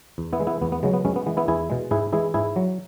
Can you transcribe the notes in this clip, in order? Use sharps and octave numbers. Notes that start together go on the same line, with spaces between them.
E2
B3 E4
E3 G#3
B3 E4
E2 B3
B3
C#3 F#3 G#3
B3
F#2 G#3 C#4
B3
E3 G#3 B3
B3 E4
E2 E4 G#4
B2 G#3
G#2 E4 G#4
E3 G#3 E4 G#4
G#2 E4 G#4
F#3